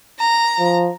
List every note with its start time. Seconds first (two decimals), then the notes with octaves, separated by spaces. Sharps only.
0.20 A#5
0.59 F3